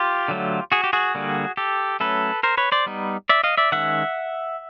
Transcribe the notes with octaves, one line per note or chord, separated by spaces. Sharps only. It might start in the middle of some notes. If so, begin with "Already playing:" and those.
Already playing: F4 G4
D3 F#3 A3
F#4 G#4
G4
F#4 G#4
D3 G3 A#3
G4 A4
F#3 A3 C#4 A4 B4
A#4 C5
B4 C#5
C5 D5
G3 B3 D#4
D5 E5
D#5 F5
D5 E5
D#3 G#3 C#4 E5 F#5